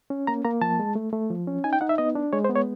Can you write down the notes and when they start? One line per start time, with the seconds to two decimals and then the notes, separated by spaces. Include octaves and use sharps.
0.10 C#4
0.27 A#3 A#5
0.45 A#3 A#5
0.62 F3 A5
0.80 G#3
0.95 A3
1.13 A3
1.30 F3
1.47 C#4
1.64 D#4 G#5
1.73 G5
1.81 D#4 F#5
1.89 E5
1.98 B3 D#5
2.15 D4
2.33 G#3 C#5
2.44 C5
2.49 B3
2.55 C#5